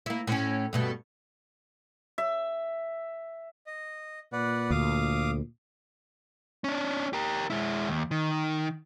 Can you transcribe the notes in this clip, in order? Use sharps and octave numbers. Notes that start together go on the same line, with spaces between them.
A#3 E4
A2 C#4
G2 B2 A3
E5
D#5
A#2 B4 D5 F#5
D2 F5 D6 D#6
C#4 D4
G4 A#4
G#3 E4
D#2
D#3